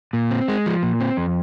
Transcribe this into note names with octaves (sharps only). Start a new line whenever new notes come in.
A#2
C4
G#3
F3
A#2
C4
F2